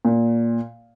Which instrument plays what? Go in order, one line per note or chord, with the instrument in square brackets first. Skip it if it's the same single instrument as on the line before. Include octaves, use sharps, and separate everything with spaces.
[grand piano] A#2